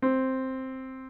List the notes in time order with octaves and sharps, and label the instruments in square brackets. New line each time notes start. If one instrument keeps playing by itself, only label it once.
[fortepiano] C4